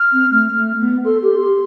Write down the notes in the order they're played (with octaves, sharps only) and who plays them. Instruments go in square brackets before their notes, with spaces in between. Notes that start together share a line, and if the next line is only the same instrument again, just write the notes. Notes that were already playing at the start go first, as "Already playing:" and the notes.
Already playing: [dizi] F6
[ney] C4
A3
A3
B3
[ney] A4 [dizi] C6
[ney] G4
G4